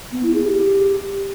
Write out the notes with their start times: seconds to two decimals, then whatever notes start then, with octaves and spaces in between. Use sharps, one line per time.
0.12 B3
0.23 E4
0.34 G#4
0.45 G4